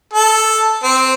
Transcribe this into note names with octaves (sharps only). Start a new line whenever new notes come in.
A4
C4